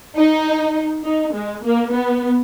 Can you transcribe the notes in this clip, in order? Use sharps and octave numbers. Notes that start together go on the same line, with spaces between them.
D#4
D#4
G#3
A#3
B3